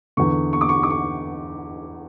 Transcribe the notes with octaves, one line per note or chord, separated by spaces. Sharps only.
E2 D3 C#6
C#6
D6
C#6
D6
C#6